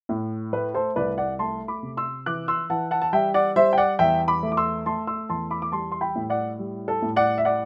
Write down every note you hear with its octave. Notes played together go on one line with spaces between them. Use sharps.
A2
A3 B4
A4 C5
C2 B4 D5
D5 F#5
A3 A5 C6
B5 D6
C3
C6 E6
E3 D6 F#6
C6 E6
E3 F#5 A5
F#5 A5
A5
G3 E5 G5
D5 F#5
G3 C5 E5
G5
D5 F#5
E2 E5 G5
B5 D6
A3
D6
C6 E6
A3 A5 C6
C6 E6
E2 A5 C6
B5 D6
D6
G3 A5 C6
C6
G5 B5
A2
D5 F#5
G3
A4
A2
D5 F#5
E5
D5 F#5